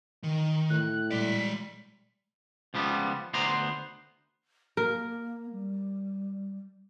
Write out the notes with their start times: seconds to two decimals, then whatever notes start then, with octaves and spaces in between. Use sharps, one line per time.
0.23 D#3
0.70 A2 F#6
1.11 A#2 G3 G#3 D5 B6
2.74 C#2 F3 G3 B3
3.34 D2 B3 C5 A#5 C6
4.77 A#3 A#4
5.52 G3